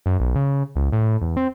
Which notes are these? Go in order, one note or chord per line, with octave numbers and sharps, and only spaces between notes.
F#2
B1
C#3
C#2
A2
E2
C4